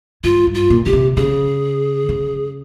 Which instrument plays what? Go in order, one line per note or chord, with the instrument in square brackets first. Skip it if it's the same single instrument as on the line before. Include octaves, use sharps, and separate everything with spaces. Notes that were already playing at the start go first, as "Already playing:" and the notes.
[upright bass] G2 [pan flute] F4
[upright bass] G2
[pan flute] F4
[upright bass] A#2
[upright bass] C#3 [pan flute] G4
[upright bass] C3
[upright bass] C#3 [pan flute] G#4
[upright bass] C#3